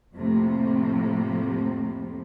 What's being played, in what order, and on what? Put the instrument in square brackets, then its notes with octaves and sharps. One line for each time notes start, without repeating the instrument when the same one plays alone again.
[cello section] F2 A2 C3 F3 A3 A#3